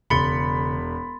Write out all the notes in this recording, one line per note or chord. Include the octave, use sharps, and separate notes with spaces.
E1 C#3 B5 C6 A6 C#7 G7